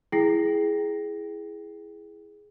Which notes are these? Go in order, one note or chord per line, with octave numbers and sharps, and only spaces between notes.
E4 G#4 G5 A#6 C7